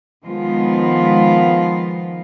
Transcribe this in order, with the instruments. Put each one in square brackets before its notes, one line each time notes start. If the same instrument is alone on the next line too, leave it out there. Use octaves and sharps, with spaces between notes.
[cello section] D#3 F3 G#3 B3 F4